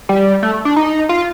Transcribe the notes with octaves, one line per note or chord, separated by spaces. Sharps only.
G3
A3
D4
D#4
F4